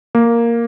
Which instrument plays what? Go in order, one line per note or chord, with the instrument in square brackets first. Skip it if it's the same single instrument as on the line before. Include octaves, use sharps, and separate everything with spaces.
[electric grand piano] A#3